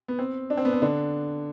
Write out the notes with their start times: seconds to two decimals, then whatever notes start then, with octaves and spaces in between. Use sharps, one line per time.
0.08 B3
0.19 C4
0.50 D4
0.57 C4
0.65 B3
0.73 C4
0.82 D3 D4